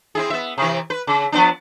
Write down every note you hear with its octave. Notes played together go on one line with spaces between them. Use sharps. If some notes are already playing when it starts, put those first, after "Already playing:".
C4 E4 G#4
B3 E5
C3 E3
B4
C#3
F3 B3 D4